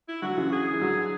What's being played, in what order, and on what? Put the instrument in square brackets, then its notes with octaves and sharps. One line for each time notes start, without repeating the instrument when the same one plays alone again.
[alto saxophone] E4
[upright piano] D3 F#3 [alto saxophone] F#4
[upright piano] C#3 E3
[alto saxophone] G#4
[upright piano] E3
D3 F#3